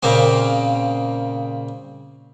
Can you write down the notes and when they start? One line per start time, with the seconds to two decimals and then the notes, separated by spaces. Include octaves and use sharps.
0.03 A#2 C#3 A#3 C4